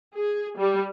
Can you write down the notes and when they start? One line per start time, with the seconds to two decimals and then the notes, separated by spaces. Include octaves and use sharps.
0.16 G#4
0.58 G3